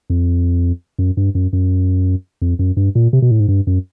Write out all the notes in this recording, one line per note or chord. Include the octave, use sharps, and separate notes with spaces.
F2
F#2
G2
F#2
F#2
F2
F#2
G2
A#2
C3
B2
A2
G#2
G2
F#2